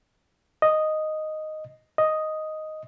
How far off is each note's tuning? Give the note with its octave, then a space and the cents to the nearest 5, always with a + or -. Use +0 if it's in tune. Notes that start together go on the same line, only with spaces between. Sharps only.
D#5 -5
D#5 +0